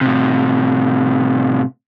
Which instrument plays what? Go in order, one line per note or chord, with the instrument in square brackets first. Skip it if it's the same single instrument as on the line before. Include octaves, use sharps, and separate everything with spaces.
[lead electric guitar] A2 C3